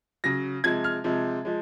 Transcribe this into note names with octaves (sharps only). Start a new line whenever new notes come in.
C#3 F#3 A#6
C3 F3 G#3 G#6
F6
C3 F3 G#3
F3 G#3